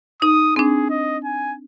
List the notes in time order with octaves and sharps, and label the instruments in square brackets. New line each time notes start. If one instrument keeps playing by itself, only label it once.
[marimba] D#4 [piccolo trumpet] D#6
[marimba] C4 D4 [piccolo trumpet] G#4
[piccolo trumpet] D#5
G#5